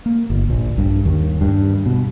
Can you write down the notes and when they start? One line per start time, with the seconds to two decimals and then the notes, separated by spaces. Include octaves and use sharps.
0.06 A#3
0.30 G1
0.50 A#1
0.78 G2
1.05 D#2
1.41 G2
1.86 B2